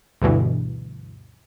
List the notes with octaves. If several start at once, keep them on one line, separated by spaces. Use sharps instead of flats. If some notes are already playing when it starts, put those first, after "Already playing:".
D2 G2 B2 E3